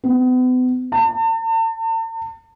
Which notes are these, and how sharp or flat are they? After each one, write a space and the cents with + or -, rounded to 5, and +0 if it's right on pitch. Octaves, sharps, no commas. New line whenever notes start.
B3 +40
A5 +40